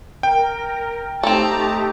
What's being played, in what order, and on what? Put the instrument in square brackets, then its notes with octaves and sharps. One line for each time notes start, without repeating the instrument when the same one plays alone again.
[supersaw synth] A#4 [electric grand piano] G5
[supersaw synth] A3 D#4 G4 [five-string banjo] C4 A4 [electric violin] A5 A#5